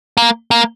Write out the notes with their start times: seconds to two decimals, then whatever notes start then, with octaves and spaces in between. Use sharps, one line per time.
0.17 A#3
0.51 A#3